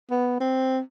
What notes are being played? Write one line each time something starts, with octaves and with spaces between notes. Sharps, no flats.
B3
C4